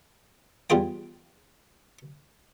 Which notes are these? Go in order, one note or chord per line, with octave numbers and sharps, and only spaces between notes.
E2 G3 F4 G#4 G5